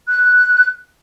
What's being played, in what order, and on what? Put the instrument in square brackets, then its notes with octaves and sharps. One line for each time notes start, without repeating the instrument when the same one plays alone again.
[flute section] F#6